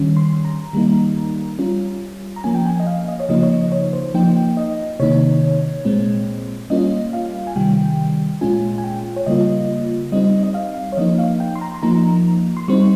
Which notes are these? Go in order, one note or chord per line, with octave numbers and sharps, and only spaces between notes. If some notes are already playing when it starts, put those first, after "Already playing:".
Already playing: D#3 G3 C#4
C6
A#5
D#3 G3 A#3 D#4
G3 C#4 F4
A#5
F3 A#3 C#4 G#5
G5
G#5
D#5
F5
D#5
C#5
C#3 F3 A#3 D#4 D#5
C#5
D#5
C#5
C5
F3 A#3 D#4 G5
D#5
C3 D#3 A#3 D#4 C#5
A#2 G#3 C4
G3 A#3 C#4 F4 D#5
F5
G#5
C3 D#3 G3 G5
A#2 G#3 C#4 F4 G#5
G#5
G5
C#5
C#3 G3 A#3 F4 D#5
G3 C4 D#4 D#5
D#5
F5
C#5
F3 A#3 D#4 D#5
F5
G5
C6
A#5
C6
F3 A#3 D#4 A#5
C6
G3 C4 D#4 C#6